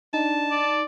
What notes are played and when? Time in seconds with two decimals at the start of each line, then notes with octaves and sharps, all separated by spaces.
0.14 D4 D#4 A5
0.51 D5